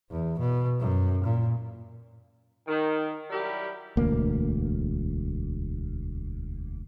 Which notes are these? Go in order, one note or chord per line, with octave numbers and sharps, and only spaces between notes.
E2
B2
F#2
A#2
D#3
F#3 G3 E4 G4 A#4
E1 D2 A#3